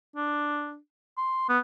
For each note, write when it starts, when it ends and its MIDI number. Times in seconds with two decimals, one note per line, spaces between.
0.16 0.78 62
1.17 1.49 84
1.49 1.59 59